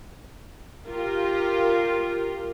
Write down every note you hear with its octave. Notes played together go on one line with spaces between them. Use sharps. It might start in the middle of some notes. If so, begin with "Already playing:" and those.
F4 G4 A#4